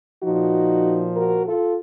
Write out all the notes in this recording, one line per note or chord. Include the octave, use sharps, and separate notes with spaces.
A#2 F3 D#4 F#4
F#4 A#4
F4 A4